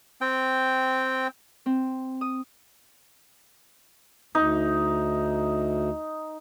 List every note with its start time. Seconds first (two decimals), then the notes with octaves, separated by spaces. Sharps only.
0.21 C4 G5
1.66 C4
2.21 D#6
4.35 D2 D#4